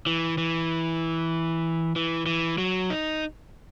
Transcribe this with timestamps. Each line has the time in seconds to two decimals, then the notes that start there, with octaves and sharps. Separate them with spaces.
0.06 E3
0.38 E3
1.96 E3
2.26 E3
2.58 F#3
2.90 D#4